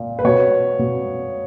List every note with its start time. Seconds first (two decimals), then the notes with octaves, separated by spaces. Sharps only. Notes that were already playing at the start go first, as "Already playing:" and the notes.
Already playing: A#2
0.19 B4
0.24 B2 C#5
0.79 B2